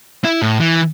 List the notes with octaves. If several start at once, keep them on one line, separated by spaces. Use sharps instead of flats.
E4
A2
E3